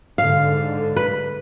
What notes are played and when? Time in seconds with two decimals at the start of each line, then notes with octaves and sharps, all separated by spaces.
0.18 G#2 D3 F5
0.96 B4